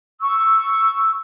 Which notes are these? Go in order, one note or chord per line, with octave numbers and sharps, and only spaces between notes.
C#6 E6